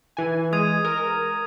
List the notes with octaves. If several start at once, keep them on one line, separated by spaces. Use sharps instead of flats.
E3 G#5
G#3 D#6 G#6 D#7
A#4